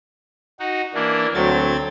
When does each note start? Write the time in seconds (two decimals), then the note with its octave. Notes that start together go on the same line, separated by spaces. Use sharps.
0.60 D#4 F#4
0.94 E3 A#3 D4
1.35 D2 F#3 C4 G#6 A6